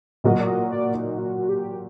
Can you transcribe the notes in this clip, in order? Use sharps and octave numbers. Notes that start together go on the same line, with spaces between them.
A#2 F#3 A#3 F#4 D#5
D5
D#5
D5
D#4
F#4
G4